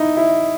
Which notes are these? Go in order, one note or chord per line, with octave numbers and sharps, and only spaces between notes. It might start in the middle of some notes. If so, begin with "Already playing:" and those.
Already playing: D#4 E4
E4